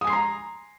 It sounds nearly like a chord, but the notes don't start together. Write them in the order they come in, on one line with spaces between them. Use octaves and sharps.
D#6 G#5 C7 C6 A#5